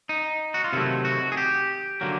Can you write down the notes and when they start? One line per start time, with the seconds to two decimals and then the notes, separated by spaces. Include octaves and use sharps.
0.09 D#4
0.54 F#4
0.64 F4
0.73 C3 D#3 F#3 A3 E4
1.05 F#4
1.32 G#4
1.37 G4
2.01 D3 F#3 A#3